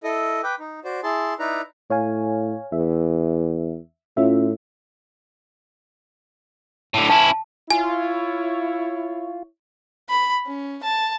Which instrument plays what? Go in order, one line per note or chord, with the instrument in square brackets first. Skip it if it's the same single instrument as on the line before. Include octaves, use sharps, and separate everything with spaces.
[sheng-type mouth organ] E4 A4 D#5
B4 G5 D6
D#4
F#4 C5 D5
E4 G#4 A5 C6
D#4 E4 B4 D5 A#5
[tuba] A2 [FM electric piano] C#5 F5 G#5
[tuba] E2 [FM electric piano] E5
[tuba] A2 [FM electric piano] C#4 F4 E5
[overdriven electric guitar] A2 D3
[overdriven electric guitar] C#4 E4 [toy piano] A5
[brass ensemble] E4 C#5 [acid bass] F4 [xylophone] G#5
[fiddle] B5
C#4
A5